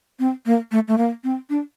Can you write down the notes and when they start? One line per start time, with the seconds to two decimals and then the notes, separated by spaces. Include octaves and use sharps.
0.19 C4
0.46 A#3
0.72 A3
0.88 A3
0.98 A#3
1.24 C4
1.50 D4